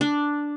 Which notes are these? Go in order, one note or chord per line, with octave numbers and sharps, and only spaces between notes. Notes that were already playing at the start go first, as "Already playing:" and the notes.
D4